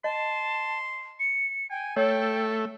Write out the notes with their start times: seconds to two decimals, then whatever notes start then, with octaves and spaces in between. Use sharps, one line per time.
0.04 D#5 A5 C6
1.20 C#7
1.70 G5 G#5
1.96 A3 A4 C#5 G5